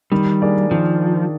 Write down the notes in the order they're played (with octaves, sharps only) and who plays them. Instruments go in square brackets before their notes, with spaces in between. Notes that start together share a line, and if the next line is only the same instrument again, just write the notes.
[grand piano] D#3 [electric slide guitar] G3
[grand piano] A#3 D4 G#4 D5
[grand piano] D#3 [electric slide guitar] F3